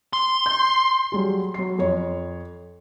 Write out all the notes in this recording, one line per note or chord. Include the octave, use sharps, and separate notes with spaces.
C6
G6
F#3 G3 G#4
F#3 C7
F2 C#5